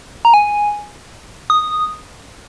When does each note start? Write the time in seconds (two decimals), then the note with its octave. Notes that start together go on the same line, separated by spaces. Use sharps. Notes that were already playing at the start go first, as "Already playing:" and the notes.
0.25 A#5
0.34 G#5
1.50 D#6